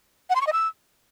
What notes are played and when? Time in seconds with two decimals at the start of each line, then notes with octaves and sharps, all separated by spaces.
0.30 F#5
0.35 C6
0.41 C#6
0.47 D#5
0.53 E6